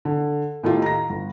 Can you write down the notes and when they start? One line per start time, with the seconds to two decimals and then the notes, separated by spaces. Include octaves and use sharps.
0.05 D3
0.63 A2 D#3 A3 F4 G4
0.82 A#5 A#6
1.10 G1